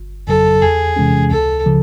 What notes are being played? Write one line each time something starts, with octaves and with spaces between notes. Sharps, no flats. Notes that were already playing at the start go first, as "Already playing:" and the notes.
Already playing: G1
F2 C#3 F#3 A4
E2 G#4
C3 E3 G#3 C#4
C#2 A4
C#3 F3